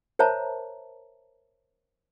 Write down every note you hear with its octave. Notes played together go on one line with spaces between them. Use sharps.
A#4 C5 C#5 E5 A5 A#5